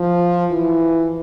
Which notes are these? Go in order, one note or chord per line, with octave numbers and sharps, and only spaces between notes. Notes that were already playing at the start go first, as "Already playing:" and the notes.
Already playing: F3
E3